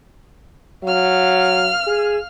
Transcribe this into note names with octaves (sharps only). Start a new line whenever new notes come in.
F#3 F5 F6
G#4